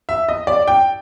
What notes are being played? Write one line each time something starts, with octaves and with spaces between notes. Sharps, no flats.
E5
D#5
D5
G5